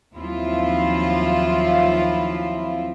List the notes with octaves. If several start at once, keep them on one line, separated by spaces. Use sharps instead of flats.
D#2 F3 F#3 C4 E4 F4